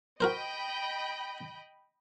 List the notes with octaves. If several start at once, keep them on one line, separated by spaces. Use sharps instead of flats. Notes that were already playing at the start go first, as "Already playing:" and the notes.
F#4 A#4 C5 D#5 G5 B5